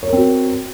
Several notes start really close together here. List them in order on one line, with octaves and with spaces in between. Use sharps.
C#5 A#4 C4 F#4